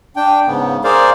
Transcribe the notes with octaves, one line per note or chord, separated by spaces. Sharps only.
D4 G5
G#2 C#3 B3
G#4 A#4 C5 D5 F5